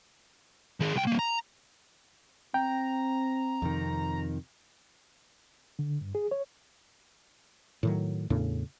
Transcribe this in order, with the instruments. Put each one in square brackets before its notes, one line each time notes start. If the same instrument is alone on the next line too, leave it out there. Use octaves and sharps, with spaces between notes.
[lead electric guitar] D#3 G#4
C2 G5
G3 A#3
A#5
[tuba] C4 [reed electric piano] G5 [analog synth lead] A#5
[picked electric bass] F2 C3 D#3
[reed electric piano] D3
G2
G#4
C#5
[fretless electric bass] A2 D#3 F#3
E2 A2 C#3 D4